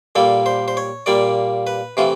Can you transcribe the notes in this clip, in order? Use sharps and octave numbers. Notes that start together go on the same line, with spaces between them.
A#2 G3 A#3 A4
C5
C5
C#5
A#2 G3 A#3 D5
B4
C3 E3 A3 F4